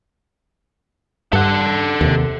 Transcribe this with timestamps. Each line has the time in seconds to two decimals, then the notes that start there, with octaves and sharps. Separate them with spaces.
1.33 G2 A4 F#5
2.01 D#2 C3